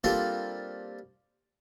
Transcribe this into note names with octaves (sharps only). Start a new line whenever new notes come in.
G3 A#3 C4 D4 F4 A4